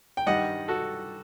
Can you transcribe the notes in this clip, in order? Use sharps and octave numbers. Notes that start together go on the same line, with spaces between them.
G5
G2 D#3 G3 D#5 F#5
F#4 A4